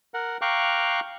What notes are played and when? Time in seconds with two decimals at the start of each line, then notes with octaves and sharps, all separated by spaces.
0.14 A#4 F#5
0.41 F5 G5 A#5 C#6 D6 F#6